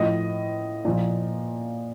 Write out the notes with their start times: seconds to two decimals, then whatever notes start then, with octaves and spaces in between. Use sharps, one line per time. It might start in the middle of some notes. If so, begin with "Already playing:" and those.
Already playing: A2 F3 D#5
0.85 A#2 F3